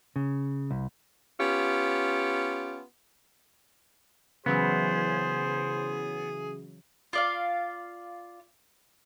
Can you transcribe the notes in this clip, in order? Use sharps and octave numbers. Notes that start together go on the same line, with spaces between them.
C#3
C2
B3 C#4 F4 G4
C#3 E3 F#3 B3 G#4 C5
F4 D5 F5